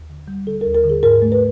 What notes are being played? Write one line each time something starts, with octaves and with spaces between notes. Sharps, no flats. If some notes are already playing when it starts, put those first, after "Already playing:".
Already playing: D#2
D3
G3
D3 A4
D#2 A#4
A#4
D3
G#4
G#2 A#4
A3
B4